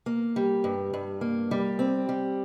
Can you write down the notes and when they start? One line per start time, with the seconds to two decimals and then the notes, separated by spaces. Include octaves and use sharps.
0.06 A#3
0.36 G3
0.64 G2
0.94 G2
1.21 A#3
1.51 G3
1.79 C4
2.09 G3